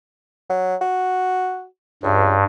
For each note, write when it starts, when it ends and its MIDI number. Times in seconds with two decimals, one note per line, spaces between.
0.50 0.76 54
0.82 1.66 66
2.03 2.35 37
2.03 2.44 43